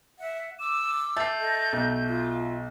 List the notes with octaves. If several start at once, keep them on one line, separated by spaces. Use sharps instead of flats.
E5 F#5
D6 E6 E7
A3 G6 A6 C7
A4 D#5
B1
F4